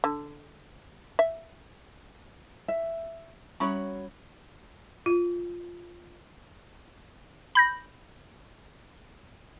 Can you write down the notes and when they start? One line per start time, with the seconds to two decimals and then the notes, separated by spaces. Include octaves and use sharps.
0.04 D3
1.19 E5
2.68 E5
3.60 G3 C#4 F#4 C#5 B5 C#6
5.06 F4
7.55 B5 G6 A#6